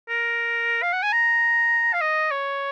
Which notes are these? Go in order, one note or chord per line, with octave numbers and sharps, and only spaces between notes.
A#4
F5
F#5
G#5
A#5
F5
D#5
C#5